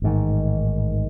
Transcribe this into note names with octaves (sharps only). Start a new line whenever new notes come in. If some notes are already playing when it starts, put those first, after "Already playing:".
A1 G#2 D#3